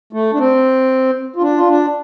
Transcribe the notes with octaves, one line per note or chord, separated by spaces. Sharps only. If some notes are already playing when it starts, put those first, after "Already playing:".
A3
D4
C4
F4
D4
F4
D4